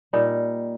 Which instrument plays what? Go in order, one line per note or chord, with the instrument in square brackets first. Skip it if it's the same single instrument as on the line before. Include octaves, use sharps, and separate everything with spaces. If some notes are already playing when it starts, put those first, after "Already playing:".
[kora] A#2 G3 D#4